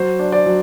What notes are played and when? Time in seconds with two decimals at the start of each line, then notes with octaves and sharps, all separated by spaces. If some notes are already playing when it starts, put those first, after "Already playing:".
Already playing: F#3 C5
0.19 D4
0.32 D5
0.46 F#3